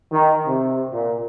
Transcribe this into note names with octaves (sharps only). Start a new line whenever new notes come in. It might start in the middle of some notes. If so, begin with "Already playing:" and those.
D#3
C3
A#2